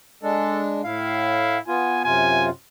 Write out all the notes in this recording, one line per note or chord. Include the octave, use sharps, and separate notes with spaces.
G#3 D4 A4
A2 E4 F5
B3 F4 G#5
F#2 C3 F4 G#5